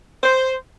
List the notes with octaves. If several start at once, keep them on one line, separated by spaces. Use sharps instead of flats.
C5